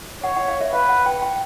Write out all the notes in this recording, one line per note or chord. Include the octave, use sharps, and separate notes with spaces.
C#5 F#5
F#5
F5
E5
B4 F5
F#5
G5
G5